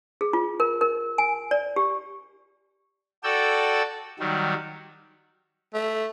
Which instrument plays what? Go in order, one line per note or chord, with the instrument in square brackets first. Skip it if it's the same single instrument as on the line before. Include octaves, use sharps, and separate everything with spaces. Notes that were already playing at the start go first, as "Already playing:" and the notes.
[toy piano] G#4
F4
A#4
A#4
G#5
D5
G4
[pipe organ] F#4 A4 D5 G5 E6
D#3 F#3 G3
[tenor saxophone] A3